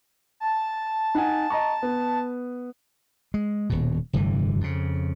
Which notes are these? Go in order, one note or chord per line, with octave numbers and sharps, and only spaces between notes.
A5
D#4 F#5 G#5
D#5 A#5 C#6
B3
G#3
D#1 B2
F1 G2 D3 E3
F2 C#3